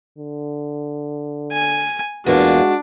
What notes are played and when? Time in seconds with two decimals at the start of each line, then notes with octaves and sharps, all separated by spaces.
0.18 D3
1.52 G#5
2.26 E2 G#3 A#3 D4 F4 F#4